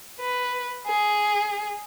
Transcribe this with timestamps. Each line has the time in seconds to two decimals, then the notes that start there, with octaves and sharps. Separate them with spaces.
0.20 B4
0.87 G#4